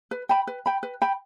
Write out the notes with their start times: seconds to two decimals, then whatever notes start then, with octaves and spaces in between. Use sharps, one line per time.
0.11 B4
0.29 G5 B5
0.47 B4
0.66 G5 B5
0.83 B4
1.02 G5 B5